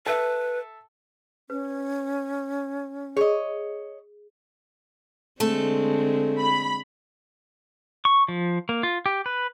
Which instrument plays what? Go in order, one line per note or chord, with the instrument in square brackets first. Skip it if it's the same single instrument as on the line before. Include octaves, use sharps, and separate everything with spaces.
[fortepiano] A4 E5 [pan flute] B4
[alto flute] C#4 [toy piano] B4
[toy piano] G#4 [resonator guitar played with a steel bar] C#5 D#5
[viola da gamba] D3 G#3 C4 [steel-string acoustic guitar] A3 A4
[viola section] B5
[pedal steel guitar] C#6
F3
A#3
F4
G4
B4